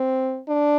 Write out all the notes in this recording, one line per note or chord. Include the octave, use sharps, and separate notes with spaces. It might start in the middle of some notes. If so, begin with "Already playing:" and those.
Already playing: C4
D4